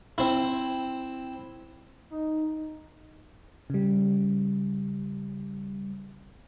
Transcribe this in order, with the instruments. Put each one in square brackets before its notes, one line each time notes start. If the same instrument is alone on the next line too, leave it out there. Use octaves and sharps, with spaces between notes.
[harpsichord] C4 E4
[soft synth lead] D#4
[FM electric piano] C#3 G3